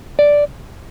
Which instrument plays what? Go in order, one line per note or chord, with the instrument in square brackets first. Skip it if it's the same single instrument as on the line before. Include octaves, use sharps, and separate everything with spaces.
[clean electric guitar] D5